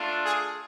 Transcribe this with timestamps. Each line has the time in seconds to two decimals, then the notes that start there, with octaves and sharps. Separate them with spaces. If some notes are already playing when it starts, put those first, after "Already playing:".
Already playing: A3 D4 F4
0.24 G#4